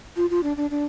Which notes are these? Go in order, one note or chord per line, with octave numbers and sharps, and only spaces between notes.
F4
F4
D4
D4
D4